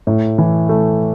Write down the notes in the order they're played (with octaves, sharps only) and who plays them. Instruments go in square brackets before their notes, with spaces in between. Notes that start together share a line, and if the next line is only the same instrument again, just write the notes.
[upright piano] A2
E3
A3